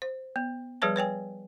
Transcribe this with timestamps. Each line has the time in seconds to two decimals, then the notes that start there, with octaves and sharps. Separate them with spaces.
0.02 C5
0.36 B3
0.82 F3 G3 G#4 B4 C#5 A5
0.96 B4 C#5 G5 G#5